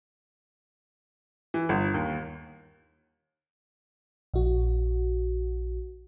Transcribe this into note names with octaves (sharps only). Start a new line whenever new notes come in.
E3
G1
D#2
A#1 F#4